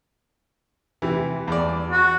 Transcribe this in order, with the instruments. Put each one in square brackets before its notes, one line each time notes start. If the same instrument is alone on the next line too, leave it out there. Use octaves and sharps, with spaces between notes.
[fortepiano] C3 E3
E2 D5
[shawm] F#4